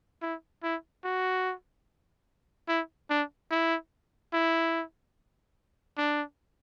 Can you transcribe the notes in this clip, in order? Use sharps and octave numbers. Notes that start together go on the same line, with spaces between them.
E4
E4
F#4
E4
D4
E4
E4
D4